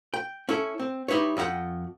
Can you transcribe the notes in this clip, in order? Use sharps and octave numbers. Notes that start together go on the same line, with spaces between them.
G5
C#4 E4 A4
C4
G3 D#4 E4 B4 C#5
F2 D#4 G4 F#5 G5